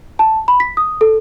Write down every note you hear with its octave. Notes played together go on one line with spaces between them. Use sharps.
A5
B5
B6
D#6
A4